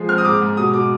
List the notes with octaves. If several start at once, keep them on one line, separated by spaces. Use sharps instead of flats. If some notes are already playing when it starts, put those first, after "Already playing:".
Already playing: F3 G#3
C4 F6
D#6
G#2 D6
G#2
B2 D#6
B2 D6